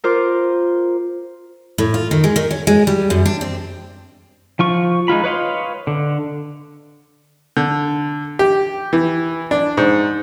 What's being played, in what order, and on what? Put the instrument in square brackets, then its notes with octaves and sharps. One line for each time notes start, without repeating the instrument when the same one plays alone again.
[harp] F4 A#4 C5 D6
[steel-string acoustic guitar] A2
F4
D#3
G#3
D#3
C#4
G#3
G3
F#2
D4
C4
[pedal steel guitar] F3 F4 C#6
G#3 D#4 F4 B5
B4 C#5 D#5 F5 C6
D3
[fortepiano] D3
G4
E3
D4
G#2